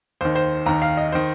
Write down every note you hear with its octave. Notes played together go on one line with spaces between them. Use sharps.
D#2 D#3 C5
C5
D#2 D#3 A#5
F5
D#5
D#3 C5